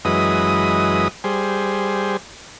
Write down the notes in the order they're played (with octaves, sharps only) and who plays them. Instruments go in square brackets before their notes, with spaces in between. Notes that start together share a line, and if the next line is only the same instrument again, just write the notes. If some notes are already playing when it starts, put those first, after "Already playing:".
[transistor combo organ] F#2 E3 G#3 B4 D#5 D#6
G3 G#4 C5